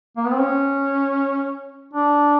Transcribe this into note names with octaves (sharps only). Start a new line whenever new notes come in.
A#3
B3
C4
C#4
D4